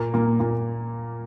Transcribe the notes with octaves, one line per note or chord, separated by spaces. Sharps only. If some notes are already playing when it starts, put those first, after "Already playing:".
Already playing: A#2 A#3
A#2 A#3
A#2 A#3